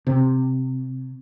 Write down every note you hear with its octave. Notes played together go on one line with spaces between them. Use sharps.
C3